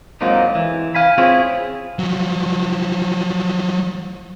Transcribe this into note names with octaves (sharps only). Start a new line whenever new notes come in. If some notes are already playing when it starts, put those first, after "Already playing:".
F2 F3 F#3 G#3 A#3 D#4
E3
F5 G#5 B5
C4 E4 F4 G#4 C5 C#5
F3 F#3